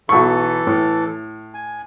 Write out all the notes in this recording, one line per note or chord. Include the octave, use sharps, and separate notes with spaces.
B1 E3 A4 C#6
A2
G#5